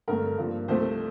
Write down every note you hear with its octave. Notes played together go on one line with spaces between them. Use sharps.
G2 D3 A3 A#4
G2 F3 A#3
C2 C3 F3 A3 C5